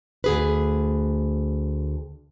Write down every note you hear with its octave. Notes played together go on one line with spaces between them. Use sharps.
D2 G#4 B4